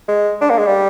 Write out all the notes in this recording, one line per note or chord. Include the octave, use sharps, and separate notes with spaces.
G#3
D4
A#3
G#3
G3